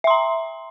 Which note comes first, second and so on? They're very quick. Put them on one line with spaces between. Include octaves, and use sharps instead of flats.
E5 C6 A#5